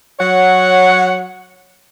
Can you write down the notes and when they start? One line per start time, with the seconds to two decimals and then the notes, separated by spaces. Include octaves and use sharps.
0.20 F#3 C#5 F#5